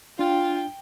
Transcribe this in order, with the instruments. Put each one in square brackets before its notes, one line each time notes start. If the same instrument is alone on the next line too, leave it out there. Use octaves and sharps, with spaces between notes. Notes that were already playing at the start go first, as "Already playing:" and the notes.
[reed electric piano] D4 [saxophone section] F4 [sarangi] G5